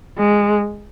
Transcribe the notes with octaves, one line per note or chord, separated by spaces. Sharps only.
G#3